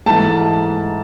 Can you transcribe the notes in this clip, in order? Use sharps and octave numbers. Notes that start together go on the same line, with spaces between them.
G#2 E3 A3 A5